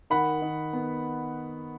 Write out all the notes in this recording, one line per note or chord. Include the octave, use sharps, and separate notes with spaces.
D#3 F#5 B5
D#3
B3